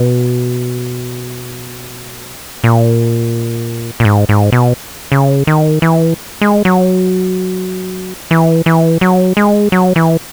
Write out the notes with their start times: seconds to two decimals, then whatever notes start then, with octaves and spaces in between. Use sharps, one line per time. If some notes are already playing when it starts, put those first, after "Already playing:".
Already playing: B2
2.64 A#2
4.00 A#2
4.05 G#2
4.29 G#2
4.52 B2
5.12 C#3
5.47 D#3
5.82 E3
6.41 G#3
6.65 F#3
8.31 E3
8.66 E3
9.01 F#3
9.37 G#3
9.72 F#3
9.96 E3